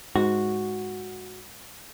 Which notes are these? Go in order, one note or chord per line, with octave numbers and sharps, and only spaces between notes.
G#2 F#4